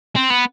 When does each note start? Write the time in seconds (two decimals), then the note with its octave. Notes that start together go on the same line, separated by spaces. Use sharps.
0.16 C4
0.30 B3